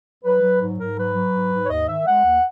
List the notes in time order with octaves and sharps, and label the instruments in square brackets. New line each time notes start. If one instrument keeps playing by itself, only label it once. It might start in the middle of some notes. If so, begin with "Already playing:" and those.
[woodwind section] F#3 B4
F#3
G#2
G#2 A#4
F#3 B4
F#3
G#2
G#2
C#5
D#2 D#5
D#3 E5
G#3 F#5
D#2